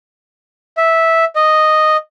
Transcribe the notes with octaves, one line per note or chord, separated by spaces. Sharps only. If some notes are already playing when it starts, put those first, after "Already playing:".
E5
D#5